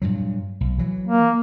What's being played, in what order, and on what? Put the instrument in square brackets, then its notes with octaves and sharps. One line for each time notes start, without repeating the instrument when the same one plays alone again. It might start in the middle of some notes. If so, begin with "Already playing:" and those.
[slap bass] G2 A#2 F#3
B1
E3 F#3
[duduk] A#3